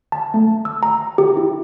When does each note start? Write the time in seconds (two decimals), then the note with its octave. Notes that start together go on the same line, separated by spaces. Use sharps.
0.12 A5
0.34 A3
0.65 E6
0.83 A#5
1.18 G4
1.37 E4